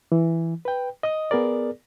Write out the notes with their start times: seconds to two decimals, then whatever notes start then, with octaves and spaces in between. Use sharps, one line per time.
0.12 E3
0.65 B4 G5
1.03 D#5 D#6
1.31 B3 G#4 A#4 D5